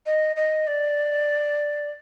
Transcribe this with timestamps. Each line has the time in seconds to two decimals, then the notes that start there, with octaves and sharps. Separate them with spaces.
0.06 D#5
0.36 D#5
0.67 D5